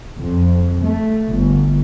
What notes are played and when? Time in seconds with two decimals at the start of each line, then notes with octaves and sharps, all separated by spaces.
0.20 F2
0.81 A3
1.29 G1